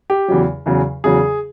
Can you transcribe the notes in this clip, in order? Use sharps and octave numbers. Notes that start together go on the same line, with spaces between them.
G4
E2 C#3 F#3
E2 C#3 F#3
E2 C#3 F#3 G#4